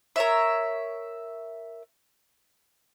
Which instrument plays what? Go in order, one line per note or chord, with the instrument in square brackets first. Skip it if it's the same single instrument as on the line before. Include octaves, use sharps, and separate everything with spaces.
[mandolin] A#4 C#5 E5